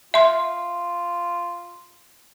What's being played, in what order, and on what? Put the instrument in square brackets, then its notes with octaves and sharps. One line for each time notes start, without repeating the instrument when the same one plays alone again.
[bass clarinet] F4 [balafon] E5 C6